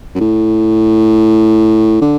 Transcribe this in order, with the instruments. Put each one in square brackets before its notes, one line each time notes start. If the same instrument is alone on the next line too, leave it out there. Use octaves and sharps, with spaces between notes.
[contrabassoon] F#2
A2
D3